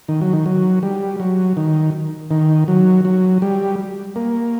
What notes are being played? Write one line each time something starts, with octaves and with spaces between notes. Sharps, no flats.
D#3
F#3
D#3
F#3
G3
F#3
D#3
D#3
F#3
F#3
G3
A#3